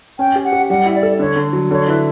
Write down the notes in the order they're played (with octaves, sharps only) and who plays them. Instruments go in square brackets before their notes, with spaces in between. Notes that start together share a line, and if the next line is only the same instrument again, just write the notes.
[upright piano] C#4 [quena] G5
[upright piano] G4
[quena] F#5
[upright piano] G4
[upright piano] G3 [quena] F#5
[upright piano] E4
[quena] D5
[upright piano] A4
[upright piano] D3 [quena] C#5
[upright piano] D3
F#3
[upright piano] D3 [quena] C#5
[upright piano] E4 [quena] B4